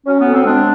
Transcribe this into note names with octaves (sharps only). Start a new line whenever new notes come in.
F#3 C#4
B3
D2
C4
G#3 D4